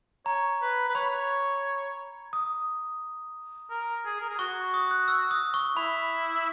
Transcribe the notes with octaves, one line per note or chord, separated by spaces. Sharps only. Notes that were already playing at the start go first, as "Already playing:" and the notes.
C#5 A#5
B4
B4
C#5 B5
D#6
A#4
G#4
A#4
G#4
F#4 C#6
D#6
F#6
E6
D#6
C#6
E4 B5